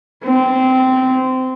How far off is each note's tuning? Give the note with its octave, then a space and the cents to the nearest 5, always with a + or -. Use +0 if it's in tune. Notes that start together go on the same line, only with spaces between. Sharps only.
C4 -15